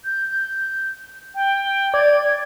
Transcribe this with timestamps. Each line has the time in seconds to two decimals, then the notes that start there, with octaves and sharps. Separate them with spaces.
0.05 G6
1.35 G5
1.94 D5 G#6